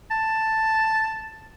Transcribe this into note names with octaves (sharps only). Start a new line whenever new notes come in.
A5